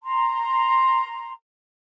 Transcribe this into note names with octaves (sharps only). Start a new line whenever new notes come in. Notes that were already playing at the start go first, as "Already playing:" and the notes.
A#5 C6